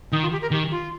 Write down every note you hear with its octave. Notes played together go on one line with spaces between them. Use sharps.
D#3 D#4
F4
G4
A#4
D#3 G4
F4